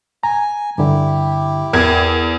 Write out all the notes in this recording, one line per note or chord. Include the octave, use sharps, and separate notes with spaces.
G#5 A#5
G2 D3 E4 G4
E2 A#4 G#6